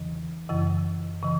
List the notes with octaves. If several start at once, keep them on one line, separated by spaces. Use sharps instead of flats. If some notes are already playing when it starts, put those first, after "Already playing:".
Already playing: E2 C#3 E3
F#2 C#3 E3
C#3 E3